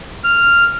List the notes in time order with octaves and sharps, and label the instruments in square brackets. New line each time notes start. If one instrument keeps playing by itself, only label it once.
[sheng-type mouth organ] F6